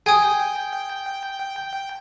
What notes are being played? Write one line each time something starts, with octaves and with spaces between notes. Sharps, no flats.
G#4 G5 G#5 D#6